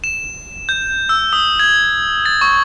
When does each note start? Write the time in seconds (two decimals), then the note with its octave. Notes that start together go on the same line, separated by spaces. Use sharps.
0.04 E7
0.69 G6
1.09 E6
1.33 D#6
1.59 G#6
2.26 A6
2.41 C#6